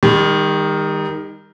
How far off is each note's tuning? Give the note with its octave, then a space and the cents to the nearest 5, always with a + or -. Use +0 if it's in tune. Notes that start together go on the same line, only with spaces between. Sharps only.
D#3 +0 G3 +40